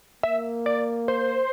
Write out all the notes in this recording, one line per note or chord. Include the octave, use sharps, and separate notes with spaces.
A#3 E5
D5
C5